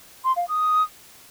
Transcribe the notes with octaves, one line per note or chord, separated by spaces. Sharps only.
C6
F5
D#6